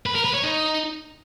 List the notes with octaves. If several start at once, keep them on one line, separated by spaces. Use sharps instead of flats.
B4
A#4
B4
C#5
D#4